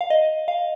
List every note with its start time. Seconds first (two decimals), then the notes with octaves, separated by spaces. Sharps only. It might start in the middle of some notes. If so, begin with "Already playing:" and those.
0.01 F5
0.10 D#5
0.48 F5